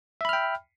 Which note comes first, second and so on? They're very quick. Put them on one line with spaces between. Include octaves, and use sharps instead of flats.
E5 B5 F6 G5